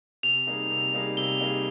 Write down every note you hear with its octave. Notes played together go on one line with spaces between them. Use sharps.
C3 F7
G3 A#3 D#4 G#4
C3
G3 A#3 D#4 G#4
C3 G7
G3 A#3 D#4 G#4